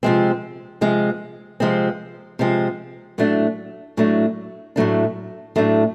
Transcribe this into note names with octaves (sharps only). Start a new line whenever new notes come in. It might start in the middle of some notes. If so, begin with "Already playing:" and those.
C3 F3 G#3 C4
C3 F3 G#3 C4
C3 F3 G#3 C4
C3 F3 G#3 C4
A2 F#3 A3 D4
A2 F#3 A3 D4
A2 F#3 A3 D4
A2 F#3 A3 D4